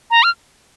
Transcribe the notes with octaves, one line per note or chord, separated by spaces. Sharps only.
A#5
F6